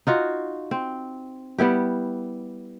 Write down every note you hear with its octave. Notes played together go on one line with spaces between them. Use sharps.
D#4 F4 F#4
C4
G3 B3 E4 G4